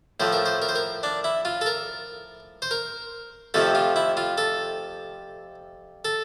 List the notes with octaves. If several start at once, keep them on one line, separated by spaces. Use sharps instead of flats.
A2 F3 A3 C5
A#4
C5
A#4
C5
A#4
D4
E4
F4
A4
A#4
C5
A#4
F2 C3 F3 A3 A4
F4
E4
F4
A4
A4